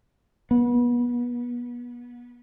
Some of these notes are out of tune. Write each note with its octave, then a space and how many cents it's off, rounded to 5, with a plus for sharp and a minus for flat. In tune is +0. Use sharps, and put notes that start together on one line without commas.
B3 -30